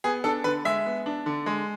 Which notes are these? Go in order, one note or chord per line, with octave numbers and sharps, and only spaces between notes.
B3 G#4
D4 A4
D3 B4
G#3 E5
B3
D4
D3
G#3